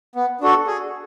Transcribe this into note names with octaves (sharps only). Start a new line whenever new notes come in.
B3
D4 F#4 A4
G#4